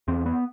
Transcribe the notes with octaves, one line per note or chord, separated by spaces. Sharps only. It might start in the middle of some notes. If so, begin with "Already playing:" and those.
E2 C4
B3